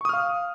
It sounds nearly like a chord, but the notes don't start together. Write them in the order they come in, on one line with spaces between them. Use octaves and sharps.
C#6 D#6 F6 F5